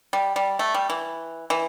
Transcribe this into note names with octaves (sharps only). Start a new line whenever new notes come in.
G3
G3
A3
G3
E3
E3